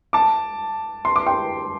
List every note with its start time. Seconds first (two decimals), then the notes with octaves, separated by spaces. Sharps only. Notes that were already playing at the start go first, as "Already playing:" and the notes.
0.13 A5 D6
1.05 C6
1.16 D6
1.27 G5 C6